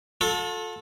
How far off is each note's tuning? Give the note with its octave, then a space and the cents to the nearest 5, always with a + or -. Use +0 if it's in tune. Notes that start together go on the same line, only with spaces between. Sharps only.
F4 +45 A4 +0